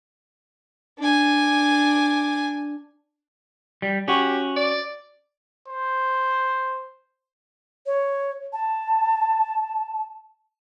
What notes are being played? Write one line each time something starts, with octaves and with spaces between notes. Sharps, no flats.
D4 G#5
G3
C#4 F#4 G4
D5
C5
C#5
A5